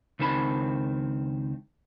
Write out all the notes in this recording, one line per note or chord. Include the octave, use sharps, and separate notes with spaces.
C#2 D#3 C4 A5 B5